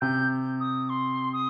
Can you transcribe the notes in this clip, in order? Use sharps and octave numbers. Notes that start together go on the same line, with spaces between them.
C3 G6
D#6
C6
D#6